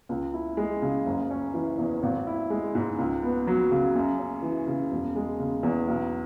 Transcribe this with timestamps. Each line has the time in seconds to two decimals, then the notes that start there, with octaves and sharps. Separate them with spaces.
0.09 C#2
0.34 E4
0.57 G#3
0.82 C#3
1.06 F#1
1.31 C#4
1.54 E3
1.78 E2
2.03 G#1
2.27 E4
2.50 G#3
2.75 G#2
2.99 C#2
3.23 B3
3.47 F#3
3.71 C#3
3.95 F#2
4.19 C#4
4.43 E3
4.67 C#3
4.92 E1
5.16 G#3
5.39 C#3
5.63 E2
5.88 B1